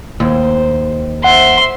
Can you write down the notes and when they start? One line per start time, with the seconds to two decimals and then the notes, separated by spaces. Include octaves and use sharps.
0.20 D#2 C5
1.24 C5 E5 F#5 C6